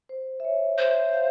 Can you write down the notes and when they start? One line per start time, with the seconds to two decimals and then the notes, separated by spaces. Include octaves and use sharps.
0.09 C5
0.40 E5
0.45 C#5
0.78 C5 E5
1.13 F5